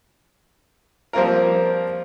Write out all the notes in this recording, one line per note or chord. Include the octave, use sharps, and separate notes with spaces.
F3 G3 A#3 C4 F4 A#4